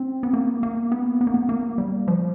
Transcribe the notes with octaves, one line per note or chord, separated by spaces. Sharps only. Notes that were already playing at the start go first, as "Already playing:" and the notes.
Already playing: C4
B3
A#3
A#3
B3
B3
A#3
B3
A#3
G3
F3